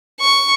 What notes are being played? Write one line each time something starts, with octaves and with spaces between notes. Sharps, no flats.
C#6